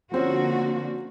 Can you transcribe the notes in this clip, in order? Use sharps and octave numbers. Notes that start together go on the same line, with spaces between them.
D3 F3 A#3 C4 C#4 F#4